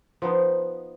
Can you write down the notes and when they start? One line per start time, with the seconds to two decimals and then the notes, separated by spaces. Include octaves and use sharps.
0.22 F3 B3 D#4